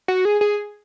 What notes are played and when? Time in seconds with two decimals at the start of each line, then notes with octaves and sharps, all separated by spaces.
0.08 F#4
0.25 G#4
0.41 G#4